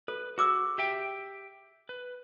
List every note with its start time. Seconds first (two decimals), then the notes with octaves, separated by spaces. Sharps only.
0.08 A4 B4
0.38 F#4 G#4 D6 E6
0.78 G4 E5 G5
1.89 B4